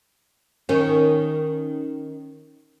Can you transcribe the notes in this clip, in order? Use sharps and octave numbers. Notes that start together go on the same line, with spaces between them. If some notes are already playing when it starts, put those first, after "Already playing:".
D#3 C#4